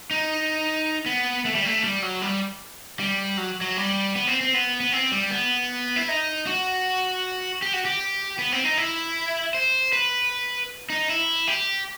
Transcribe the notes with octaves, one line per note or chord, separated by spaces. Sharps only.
D#4
B3
A3
G3
A3
G3
F#3
G3
G3
F#3
F#3
G3
B3
C4
C4
B3
B3
C4
G3
B3
E4
D#4
F#4
G4
F#4
G4
B3
C4
D#4
E4
C5
B4
D#4
E4
G4